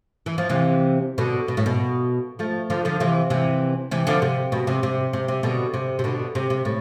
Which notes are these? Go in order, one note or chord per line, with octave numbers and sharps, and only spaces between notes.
E3
F3
C3 E3
B2 D3
B2
A2
B2
F3 A3
D3 F3
D3 F3
C3 E3
C3 E3
C3 E3
D3 F3
C3
B2
C3
C3
C3
C3
B2 D3
C3
C3
B2 D3
C3
C3
A2